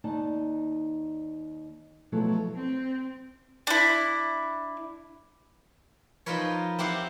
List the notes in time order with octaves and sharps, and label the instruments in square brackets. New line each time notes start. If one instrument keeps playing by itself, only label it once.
[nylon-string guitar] D#2 D#4 D5 A5
B2 F3 F#3 A3 E4 A4
[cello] C4
[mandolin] D4 E4
[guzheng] F3 D#4 F4 A#4 B4 C#5
C4 E4 G4 F5 F#5